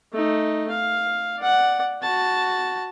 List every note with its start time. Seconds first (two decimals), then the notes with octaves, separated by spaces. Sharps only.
0.13 A3 D#4
0.70 F5
1.39 D5 F#5
2.02 F#4 A5